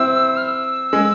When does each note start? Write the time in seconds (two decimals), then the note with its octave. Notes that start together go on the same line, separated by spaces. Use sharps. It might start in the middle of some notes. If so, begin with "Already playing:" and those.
Already playing: C4 E4 E6
0.37 F6
0.45 E6
0.93 G#3